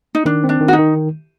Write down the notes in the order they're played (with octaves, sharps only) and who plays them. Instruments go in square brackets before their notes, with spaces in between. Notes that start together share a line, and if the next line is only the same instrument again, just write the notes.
[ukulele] D#4
[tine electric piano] D#3 [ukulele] D4
[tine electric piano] C4
[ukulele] D4
[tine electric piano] D#3
[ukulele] F#4
D#4
[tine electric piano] D#3